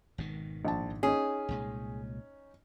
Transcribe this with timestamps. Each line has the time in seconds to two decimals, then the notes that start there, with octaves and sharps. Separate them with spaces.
0.18 G#1 B2 D#3
0.65 A#1 A5
1.03 C#4 D#4 G#4
1.49 C2 A#2 G#3